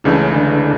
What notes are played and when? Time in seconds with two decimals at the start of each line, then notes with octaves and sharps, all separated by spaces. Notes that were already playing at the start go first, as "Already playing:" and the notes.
0.04 C#2 C#3 E3 A3 D4
0.18 C#4
0.32 D3 D4